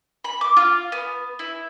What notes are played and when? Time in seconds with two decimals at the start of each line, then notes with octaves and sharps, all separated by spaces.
0.24 B5
0.41 D6
0.57 F4
0.92 B3
1.39 E4